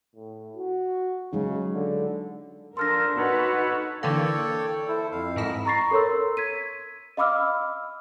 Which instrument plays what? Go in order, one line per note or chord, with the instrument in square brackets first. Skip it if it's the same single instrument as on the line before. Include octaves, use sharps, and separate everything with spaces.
[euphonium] A2
F#4
[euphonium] C#3 [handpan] F#3 G#3 D#4
[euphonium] D3
[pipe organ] F3 A4 [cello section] D4 A#4 [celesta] C6 F6 A#6
[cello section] D#4 F#4 B4 [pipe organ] A4 C#5 F#5
[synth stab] D3 E3 A#3 [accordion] A4 [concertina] C#5 D5 G5
[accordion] E4 A4 [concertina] C5
[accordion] F2 [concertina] F5
[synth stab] G#2 E3 E4 [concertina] A3 A#4 D#5
[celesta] A#5 B5 C#6 A6 A#6 C7
A4 A#4 C#5 C6 E6
G#6 B6 D#7
D#5 F5 B5 D6 E6 F6